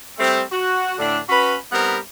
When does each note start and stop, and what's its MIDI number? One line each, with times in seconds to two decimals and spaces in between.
0.19 0.41 55
0.19 0.41 57
0.19 0.41 60
0.52 0.94 66
0.99 1.19 45
0.99 1.19 50
0.99 1.19 62
1.29 1.55 61
1.29 1.55 66
1.29 1.55 71
1.29 1.55 83
1.72 1.97 55
1.72 1.97 59
1.72 1.97 60
1.72 1.97 63
1.72 1.97 70